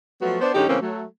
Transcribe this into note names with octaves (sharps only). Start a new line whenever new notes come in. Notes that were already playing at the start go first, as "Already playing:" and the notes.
F3 F#3 A3 B3 F#4
B3 D4 C5
F#2 D3 G#3 C#4 D#4 G4
C#3 E3 A3 A#3 C4 C#4
F#3 A3